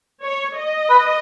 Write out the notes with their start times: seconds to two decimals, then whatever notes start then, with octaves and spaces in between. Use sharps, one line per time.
0.22 C#5
0.56 D#5
0.90 B4